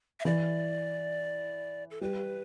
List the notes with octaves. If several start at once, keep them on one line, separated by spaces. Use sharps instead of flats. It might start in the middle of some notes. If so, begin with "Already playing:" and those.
E5
E3 D5
A4
G3 B4